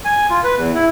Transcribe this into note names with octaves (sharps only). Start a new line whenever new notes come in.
G#5
F4
B4
E2
E4